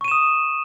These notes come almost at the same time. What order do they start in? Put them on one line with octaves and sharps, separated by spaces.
C#6 D#7 E7 D#6